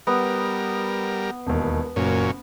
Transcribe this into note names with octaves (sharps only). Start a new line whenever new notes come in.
G3 B3 A#4
E1 D#2
F#1 F#2 A#2 C#4